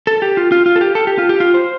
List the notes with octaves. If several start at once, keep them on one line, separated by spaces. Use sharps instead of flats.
A4
G4
F4
F4
F4
A4
G4
A4
G4
F4
G4
F4
C5